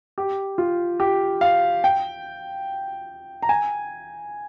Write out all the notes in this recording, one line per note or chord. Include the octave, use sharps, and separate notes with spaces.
G4
F4
G4
F5
G5
A#5
G#5